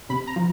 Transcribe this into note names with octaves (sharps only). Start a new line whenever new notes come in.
C3 B5
A#5
F3